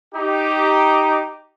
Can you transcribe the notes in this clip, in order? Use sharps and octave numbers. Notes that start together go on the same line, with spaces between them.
D#4 G4